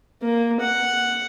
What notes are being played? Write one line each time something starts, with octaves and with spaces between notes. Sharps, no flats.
A#3
F#5